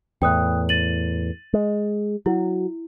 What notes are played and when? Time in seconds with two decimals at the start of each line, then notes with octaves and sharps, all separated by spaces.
0.22 E2 A2 G5 D#6 F#6
0.69 A6 D#7 F#7
1.53 G#3
2.26 F#3 E4